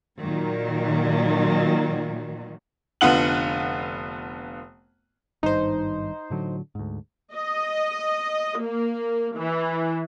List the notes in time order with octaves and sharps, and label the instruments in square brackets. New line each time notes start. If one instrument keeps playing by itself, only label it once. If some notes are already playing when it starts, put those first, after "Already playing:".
[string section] A#2 D#3 F#3
[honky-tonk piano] F1 D3 B3 F4 F#5 F#7
[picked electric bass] G#1 G2 D#3 [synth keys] D#4 C5
[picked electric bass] A2 D3 F#3
D2 G#2
[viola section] D#5
A#3
E3